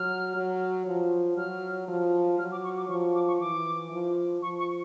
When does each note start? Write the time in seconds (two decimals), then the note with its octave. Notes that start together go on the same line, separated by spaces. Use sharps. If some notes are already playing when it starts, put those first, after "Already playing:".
Already playing: F#3 F6
0.36 F#3
0.87 F3
1.37 F#3 F6
1.88 F3
2.39 F#3 F6
2.52 D6
2.64 C#6
2.77 D6
2.89 F3 C#6
3.15 D6
3.28 C#6
3.40 E3 D6
3.91 F3
4.42 F3 C#6
4.59 C#6